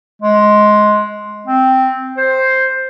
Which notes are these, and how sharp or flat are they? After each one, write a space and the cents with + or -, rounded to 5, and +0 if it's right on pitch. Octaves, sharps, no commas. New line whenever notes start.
G#3 +15
C4 -5
C5 +5